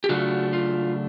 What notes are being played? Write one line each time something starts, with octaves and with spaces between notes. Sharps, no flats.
G4
C#3 F#3 A3 D4 F4 F#4
F4